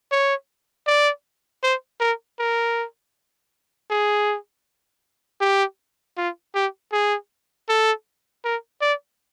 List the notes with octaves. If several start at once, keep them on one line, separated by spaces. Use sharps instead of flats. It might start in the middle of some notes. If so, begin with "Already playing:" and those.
C#5
D5
C5
A#4
A#4
G#4
G4
F4
G4
G#4
A4
A#4
D5